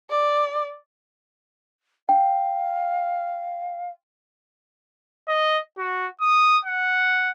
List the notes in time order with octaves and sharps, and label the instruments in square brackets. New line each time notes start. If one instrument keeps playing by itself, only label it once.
[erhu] D5
[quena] F5 [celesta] G5
[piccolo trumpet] D#5
F#4
D#6
F#5